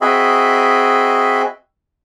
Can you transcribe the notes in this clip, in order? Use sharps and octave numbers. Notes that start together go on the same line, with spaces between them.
C4 F#4 G#4 D#5 E5 B5